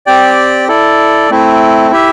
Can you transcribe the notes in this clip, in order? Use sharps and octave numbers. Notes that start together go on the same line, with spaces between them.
C4 G4 D5 G5
E4 A4 D5
A3 C4 E4
E4 G4 E5